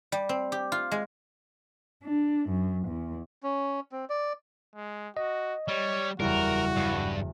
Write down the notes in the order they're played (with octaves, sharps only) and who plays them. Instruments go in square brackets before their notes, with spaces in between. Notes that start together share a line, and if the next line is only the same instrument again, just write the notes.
[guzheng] G3
C4
G4
F4
G#3
[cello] D4
F#2
E2
[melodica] C#4
C4
D5
[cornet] G#3
[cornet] F#4 [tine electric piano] D#5
[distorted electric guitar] G3 [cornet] C#5
[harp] F#1 E2 [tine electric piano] G3 E4 [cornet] F#4 [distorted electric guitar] A#4
[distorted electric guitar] G2